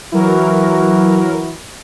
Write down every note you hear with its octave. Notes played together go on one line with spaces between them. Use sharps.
E3 F#3 E4 F#4 A#4